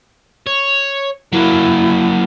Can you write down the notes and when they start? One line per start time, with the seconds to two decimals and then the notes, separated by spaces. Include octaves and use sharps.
0.47 C#5
1.33 F#3 A#3 E4